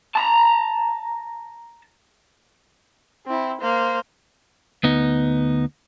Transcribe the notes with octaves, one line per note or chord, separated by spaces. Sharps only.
A5 A#5
C4 E4
A#3 C5
D2 B3 D#4